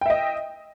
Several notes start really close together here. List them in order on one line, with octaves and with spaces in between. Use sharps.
G5 E5 D#5